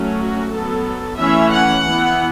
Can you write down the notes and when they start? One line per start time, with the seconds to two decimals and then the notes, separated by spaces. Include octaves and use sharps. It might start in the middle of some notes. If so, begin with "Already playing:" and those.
Already playing: F#3 A3 C#4
0.19 F#4
0.52 F#3 B3 A4
1.18 E3 A3 C#4 E5
1.52 F#5
1.85 E3 B3